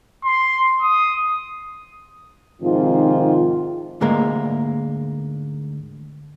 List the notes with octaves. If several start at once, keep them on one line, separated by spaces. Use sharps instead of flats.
C6
D#6
G#2 C3 D#3 F3 C4 F4
D2 G#2 G#3 A#3 A#4